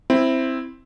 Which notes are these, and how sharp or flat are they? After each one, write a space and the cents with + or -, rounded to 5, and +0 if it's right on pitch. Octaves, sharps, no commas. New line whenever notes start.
C4 +5 E4 +0